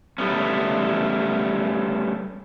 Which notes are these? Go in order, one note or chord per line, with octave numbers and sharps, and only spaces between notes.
G3 A3 B3 C#4